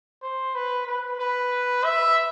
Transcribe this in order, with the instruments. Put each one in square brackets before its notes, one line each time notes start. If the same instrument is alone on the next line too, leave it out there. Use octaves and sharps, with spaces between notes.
[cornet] C5
B4
B4
B4
E5